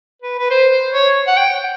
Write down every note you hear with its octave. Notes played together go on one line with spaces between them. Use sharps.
B4
B4
C5
C5
C#5
F#5
G5